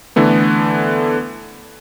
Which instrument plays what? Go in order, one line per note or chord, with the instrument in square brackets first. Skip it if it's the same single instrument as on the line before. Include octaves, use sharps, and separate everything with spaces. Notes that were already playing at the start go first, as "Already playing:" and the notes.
[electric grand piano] D3 E3 A3 B3